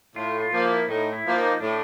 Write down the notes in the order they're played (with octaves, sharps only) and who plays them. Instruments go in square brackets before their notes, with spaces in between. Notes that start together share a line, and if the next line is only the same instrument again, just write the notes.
[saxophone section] A2 [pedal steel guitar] F4
[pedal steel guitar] F4
[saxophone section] F3 A#3
[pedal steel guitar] E4
[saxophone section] A2 [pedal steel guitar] D#4
[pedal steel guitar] E4
[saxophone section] F3 A#3
[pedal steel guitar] D#4
[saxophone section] A2 [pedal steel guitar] D4